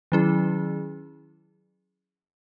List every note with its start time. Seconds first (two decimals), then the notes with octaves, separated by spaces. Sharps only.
0.12 D#3 F#3 C#4 E4 G#4